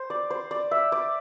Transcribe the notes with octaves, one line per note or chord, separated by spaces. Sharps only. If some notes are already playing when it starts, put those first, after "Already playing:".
Already playing: C5
D5
C5
D5
E5
D5